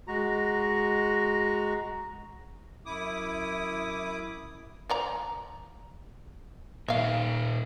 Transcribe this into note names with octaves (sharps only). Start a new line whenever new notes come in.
G#3 F#4 A#5
F#2 E4 D6 D#6
F3 D5 A#5
A#2 A#3 D#4 E5 F5